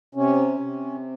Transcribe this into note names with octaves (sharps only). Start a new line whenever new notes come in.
C3 C#4
C3